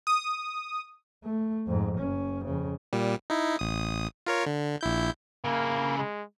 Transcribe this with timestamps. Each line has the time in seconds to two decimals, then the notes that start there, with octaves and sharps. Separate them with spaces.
0.07 D#6
1.24 A3
1.67 F2 G#2
1.99 F#1 C#4
2.44 F2 C#3
2.93 A#2 G3
3.30 D#4 E4
3.59 A1 D#6
4.27 F4 A#4 C#5
4.46 D3
4.81 A#1 E4 G6
5.44 C#3 A#3 E4
5.99 G#3